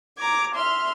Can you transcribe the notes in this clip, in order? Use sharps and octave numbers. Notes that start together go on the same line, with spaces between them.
A#5 D6 G#6
E5 C6 F6